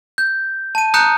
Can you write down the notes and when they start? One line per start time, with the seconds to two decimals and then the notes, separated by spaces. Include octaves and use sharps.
0.18 G6
0.75 A5 D#7
0.94 A#5 D#6 F#6 G6 C#7 E7